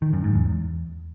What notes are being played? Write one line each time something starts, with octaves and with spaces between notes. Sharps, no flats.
D#3
F#2
G#2
E2